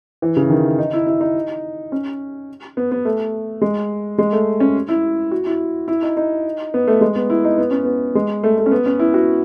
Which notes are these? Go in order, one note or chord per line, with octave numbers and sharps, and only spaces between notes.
E3
C#3
D#3
D#4
E4
E4
D#4
C#4
B3
B3
A3
G#3
G#3
A3
C#4
E4
F#4
E4
E4
D#4
D#4
B3
A3
G#3
B3
E4
D#4
B3
C#4
B3
G#3
A3
A3
C#4
B3
C#4
E4
F#4